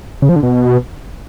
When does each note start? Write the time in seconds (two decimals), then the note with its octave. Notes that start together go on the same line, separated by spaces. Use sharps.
0.22 C#3
0.29 F3
0.36 D3
0.43 B2